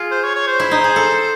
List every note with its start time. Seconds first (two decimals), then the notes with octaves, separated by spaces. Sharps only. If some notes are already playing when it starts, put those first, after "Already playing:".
Already playing: F4 G#4
0.11 C5
0.24 C#5
0.35 C#5
0.47 C5
0.60 E4
0.71 D#4
0.84 G#4
0.96 A4